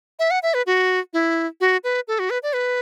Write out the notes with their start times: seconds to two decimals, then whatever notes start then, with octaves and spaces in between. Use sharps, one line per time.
0.19 E5
0.31 F#5
0.43 E5
0.54 B4
0.66 F#4
1.13 E4
1.61 F#4
1.84 B4
2.08 A4
2.19 F#4
2.30 B4
2.43 D5
2.54 B4